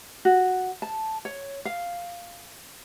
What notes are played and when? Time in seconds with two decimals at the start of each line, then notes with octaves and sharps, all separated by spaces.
0.25 F#4
0.82 A5
1.25 C#5
1.65 F5